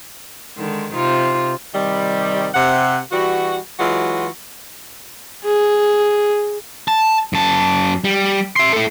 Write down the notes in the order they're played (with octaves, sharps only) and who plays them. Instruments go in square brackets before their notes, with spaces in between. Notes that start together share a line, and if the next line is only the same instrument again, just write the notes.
[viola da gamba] D3 D#3 G#3
C3 D#4 F4
[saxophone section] C3 D#3 G3
C3 F#5
E3 G3 F#4
E3 F#3 G#3 F4 F#4
[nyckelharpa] G#4
[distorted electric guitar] A5
F#2 A5
G3
E5 C6
E4 A4